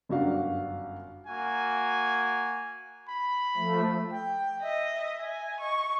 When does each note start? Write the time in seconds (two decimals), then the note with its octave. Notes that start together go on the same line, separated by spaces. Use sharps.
0.09 G1 F#2 F#3 F#4 D5 F5
1.27 A#3 F#4 G#5
3.08 B5
3.57 F3 A3
4.11 G5
4.62 D#5 E5
5.21 G#5
5.60 D#5 C#6